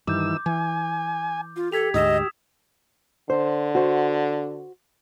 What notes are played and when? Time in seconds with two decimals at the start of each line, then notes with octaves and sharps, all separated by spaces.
0.07 G2 D#3 E3 D6 E6 G6
0.46 E3 G#5
1.56 F4
1.72 G4 A4 G#6 B6 F7
1.94 D2 G#2 D#5 D#6 E6 E7
3.30 D3 C5
3.75 F#4 C5